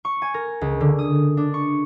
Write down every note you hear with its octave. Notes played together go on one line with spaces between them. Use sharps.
C#6
G#5
A#4
C#2
D3
D#6
D4
C#6